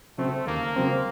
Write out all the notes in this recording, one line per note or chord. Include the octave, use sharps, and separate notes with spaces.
C#3 F#3 A3 C4
D#2 A#3
C#3 F#3 C4